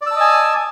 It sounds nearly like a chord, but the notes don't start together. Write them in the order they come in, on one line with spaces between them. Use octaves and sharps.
D5 E6 A5 D#5 G#5